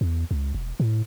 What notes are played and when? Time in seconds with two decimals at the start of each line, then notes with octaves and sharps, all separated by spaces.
0.01 E2
0.31 C#2
0.55 E1
0.80 A2